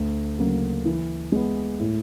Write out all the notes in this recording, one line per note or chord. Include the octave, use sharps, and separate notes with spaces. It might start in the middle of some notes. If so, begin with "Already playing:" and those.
Already playing: D2
C#3 F#3 A#3
E3
G#3 B3
A2